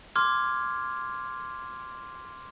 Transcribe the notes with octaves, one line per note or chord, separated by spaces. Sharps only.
C6 D6 F6 G#6